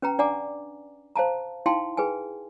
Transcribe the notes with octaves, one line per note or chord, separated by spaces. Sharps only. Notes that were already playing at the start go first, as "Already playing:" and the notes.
C#4 B4 G5 A#5
D4 D5 F#5 G#5 A#5 D6
C5 F5 A5 A#5
D#4 E4 F5 G5 A5 C6
G#4 B4 G5 G#5